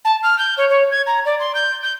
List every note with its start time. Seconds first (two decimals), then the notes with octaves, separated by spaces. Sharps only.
0.05 A5
0.23 F6
0.38 G6
0.57 C#5
0.69 C#5
0.91 G#6
1.07 A#5
1.25 D5
1.40 C6
1.55 G6
1.83 G6